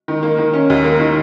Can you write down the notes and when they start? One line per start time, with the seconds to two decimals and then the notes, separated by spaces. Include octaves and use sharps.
0.08 D#3
0.23 A#3
0.38 D#3
0.53 C#4
0.70 D#2
0.84 A#3
1.00 D#3